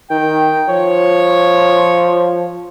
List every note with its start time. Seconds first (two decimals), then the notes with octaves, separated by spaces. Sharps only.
0.10 D#3 G5
0.69 F3 C#5